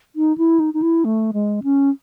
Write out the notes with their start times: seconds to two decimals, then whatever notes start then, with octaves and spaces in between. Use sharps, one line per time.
0.16 D#4
0.38 E4
0.59 D#4
0.74 D#4
0.82 E4
1.05 A3
1.33 G#3
1.63 C#4